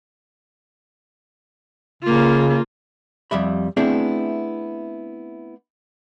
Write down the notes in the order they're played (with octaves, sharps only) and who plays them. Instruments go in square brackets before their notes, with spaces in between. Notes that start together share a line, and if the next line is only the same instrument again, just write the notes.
[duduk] C#3 [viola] A#3 F4
[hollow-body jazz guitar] F2 G3 E5 B5
A3 B3 C4 D4 E4 G#4